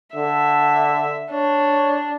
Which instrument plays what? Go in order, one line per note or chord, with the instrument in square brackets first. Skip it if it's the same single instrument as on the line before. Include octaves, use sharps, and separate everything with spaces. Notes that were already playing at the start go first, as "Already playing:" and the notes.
[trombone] D3 [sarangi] E5
[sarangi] D4 [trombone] C#5